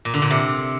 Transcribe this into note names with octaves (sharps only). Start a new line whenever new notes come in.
A#2
D3
A#2
C3